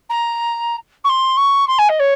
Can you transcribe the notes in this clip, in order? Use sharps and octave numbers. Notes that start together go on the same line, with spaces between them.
A#5
C#6
C6
C#6
C6
G#5
D#5
C#5